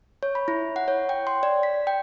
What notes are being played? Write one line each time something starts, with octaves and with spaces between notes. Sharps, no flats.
C#5
B5
E4
F#5
C#5
G5
C6
D5
B6
G5